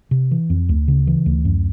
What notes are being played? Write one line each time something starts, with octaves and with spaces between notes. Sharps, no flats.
C3
E3
F2
D2
C#3
E3
D2
F#2